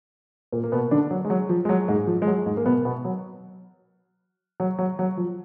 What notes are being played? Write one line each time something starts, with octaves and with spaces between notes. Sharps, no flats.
A#2 A#3
A#3
B2 B3
D3 D4
F#3
G#3
F#3
F3
G#3
F#3
G#2 G#3
F3
G#3
F#3
G#2 G#3
A#3
B2 B3
B2 B3
F#3
F#3
F#3
F#3
F3